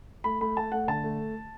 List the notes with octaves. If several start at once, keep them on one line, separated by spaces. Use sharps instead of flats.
A3 B5
A3 B5
A3 A5
A3 F#5
D3 A5
A3